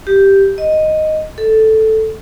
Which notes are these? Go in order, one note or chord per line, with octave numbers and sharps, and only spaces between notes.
G4
D#5
A4